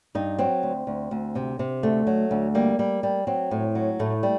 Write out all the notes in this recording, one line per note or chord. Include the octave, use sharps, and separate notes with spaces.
G2 D#4
F#3 C4
D2
D2
D2
C3
C3
D2 A3
F#3
D2
G3 A#3
G3
G3
F#3 C4
A2
F#3
A2 A3
G3